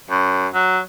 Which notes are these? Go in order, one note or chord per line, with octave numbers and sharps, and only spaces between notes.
F#2
F#3